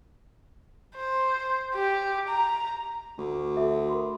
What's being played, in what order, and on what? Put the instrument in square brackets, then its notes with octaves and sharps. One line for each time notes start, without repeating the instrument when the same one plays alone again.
[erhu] C5
G4
A#5
[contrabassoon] D2
[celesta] F#4 A4 E5
A#4 B5 C6